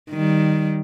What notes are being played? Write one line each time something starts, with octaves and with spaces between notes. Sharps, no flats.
D#3 G3